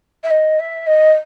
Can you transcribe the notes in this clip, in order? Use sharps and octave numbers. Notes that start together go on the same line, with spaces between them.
E5
D#5
E5
D#5